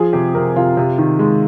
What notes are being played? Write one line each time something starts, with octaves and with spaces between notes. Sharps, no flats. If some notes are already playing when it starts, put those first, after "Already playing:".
Already playing: F3 G#4
C3 G4
C3 A#4
C3 F4
C3
D#3
G#3